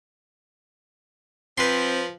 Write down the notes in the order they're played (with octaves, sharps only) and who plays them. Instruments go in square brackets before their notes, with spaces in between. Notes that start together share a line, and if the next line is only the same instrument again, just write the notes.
[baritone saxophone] F3 [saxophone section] C4 [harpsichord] B4 C6